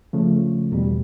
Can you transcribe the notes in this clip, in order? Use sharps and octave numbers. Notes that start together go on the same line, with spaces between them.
C#3 F3 A3
E2 B2 G3